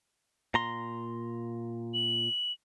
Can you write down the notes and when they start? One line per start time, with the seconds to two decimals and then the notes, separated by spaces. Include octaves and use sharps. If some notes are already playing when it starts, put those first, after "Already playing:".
0.54 A#2 A#5 C6
1.94 F#7